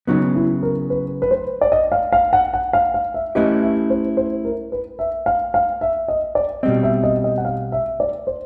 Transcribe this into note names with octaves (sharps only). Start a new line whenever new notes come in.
C#3 F#3 B3 D#4
E4
A#4
B4
B4
C5
D5
D#5
F5
F5
F#5
F#5
F5
F5
E5
A3 C#4 E4 G4 B4 D#5
E5
C5
C5
A#4
B4
E5
F5
F5
E5
D#5
D5
B2 G3 C4 D#5
E5
D#5
D#5
F#5
F5
E5
D5
C5